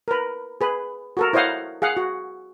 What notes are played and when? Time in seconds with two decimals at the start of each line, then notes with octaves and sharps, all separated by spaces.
0.08 A#4 B4
0.61 G#4 B4
1.17 F#4 A4 A#4
1.33 E4 C5 C#5 D#5 F5 F#5
1.82 G#4 F5 F#5
1.97 F#4